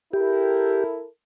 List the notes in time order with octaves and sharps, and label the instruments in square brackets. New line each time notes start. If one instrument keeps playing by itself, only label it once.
[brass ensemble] E4 A4 A#4 [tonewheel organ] G4